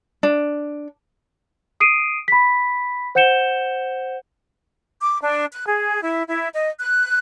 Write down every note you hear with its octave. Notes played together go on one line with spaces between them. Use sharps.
D4
D#6 C7 D7 D#7
B5 B6
C5 F#5 G6 C#7 E7 G7
D6
D4
F#6
G#4
E4
E4
D#5
F#6